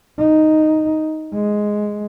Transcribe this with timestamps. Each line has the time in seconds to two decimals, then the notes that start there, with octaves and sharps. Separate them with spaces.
0.18 D#4
1.34 G#3